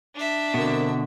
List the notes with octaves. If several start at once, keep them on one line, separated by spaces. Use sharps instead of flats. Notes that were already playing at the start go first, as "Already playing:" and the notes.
D4 E5
B2 D3 C4 F#4 A#4